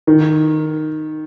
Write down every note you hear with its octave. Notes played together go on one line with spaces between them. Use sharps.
D#3